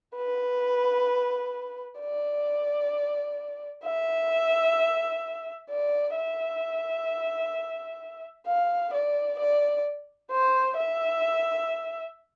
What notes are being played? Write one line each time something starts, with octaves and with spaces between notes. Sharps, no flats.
B4
D5
E5
D5
E5
F5
D5
D5
C5
E5